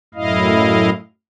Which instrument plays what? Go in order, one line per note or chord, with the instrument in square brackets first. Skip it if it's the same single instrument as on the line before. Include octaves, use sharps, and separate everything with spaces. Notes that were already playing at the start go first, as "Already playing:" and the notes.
[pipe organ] F#2 A2 E4 D#5 F5